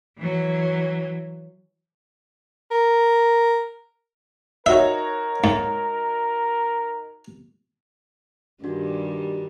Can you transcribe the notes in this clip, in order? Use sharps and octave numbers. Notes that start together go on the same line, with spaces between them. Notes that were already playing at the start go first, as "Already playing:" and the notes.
E3 F#3
A#4
D#4 F#4 A#4 C#5 E5
G#2
G2 D#3 G3 D4 F#4